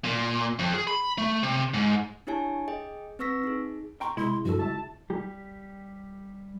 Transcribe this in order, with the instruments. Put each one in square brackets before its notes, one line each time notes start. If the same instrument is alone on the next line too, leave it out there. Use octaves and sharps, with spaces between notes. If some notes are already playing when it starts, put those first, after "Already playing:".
[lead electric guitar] A#2
F2
G#4
B5
A3
C3
G#2
[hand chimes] D4 E4 G4 C#5 G#5 A5
G#4 D#5 G5
C4 B4 C#6 E6 A#6 B6
D#4 G#4
[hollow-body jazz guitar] G5 A#5 C6 [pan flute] C#6
[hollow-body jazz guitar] C3 G#3 [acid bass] E4 [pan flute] C6
[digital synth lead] G2 [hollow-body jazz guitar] F3 A4 [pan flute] F#4
[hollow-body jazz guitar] C#2 E5 [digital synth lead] A5
[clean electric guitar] G3 G4